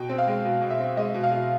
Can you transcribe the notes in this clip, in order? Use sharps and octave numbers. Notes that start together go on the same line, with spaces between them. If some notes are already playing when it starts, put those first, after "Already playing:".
Already playing: B2 G5
C4
F5
G#3
B2
B2
E5
C4
G#3 D#5
B2
F5
B2